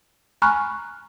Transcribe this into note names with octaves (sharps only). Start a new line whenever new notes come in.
G#5 A#5 B5 C#6 F6 F#6